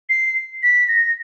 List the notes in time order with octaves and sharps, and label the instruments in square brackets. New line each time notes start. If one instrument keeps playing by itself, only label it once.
[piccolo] C7
B6
A#6